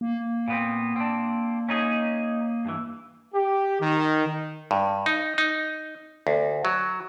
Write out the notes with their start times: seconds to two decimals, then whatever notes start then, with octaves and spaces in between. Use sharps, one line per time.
0.01 A#3
0.48 A#2 B3 C4
0.96 C4 D4
1.69 C#4 D#4 G#4
2.65 G2 E3
3.34 G4
3.80 D#3
4.71 G2
5.06 D#4
5.38 D#4
6.27 D2
6.65 F#3